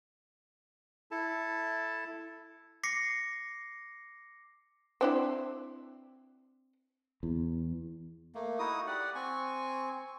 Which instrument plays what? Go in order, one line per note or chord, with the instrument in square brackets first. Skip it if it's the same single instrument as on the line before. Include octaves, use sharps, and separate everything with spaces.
[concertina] E4 A4 A5
[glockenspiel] D6 A#6 C7 C#7
[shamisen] C4 D4 E4
[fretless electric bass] E2
[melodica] A3 A#3
D#4 E4 F#4 D#6
G4 D5 F#5
C4 G#5 C#6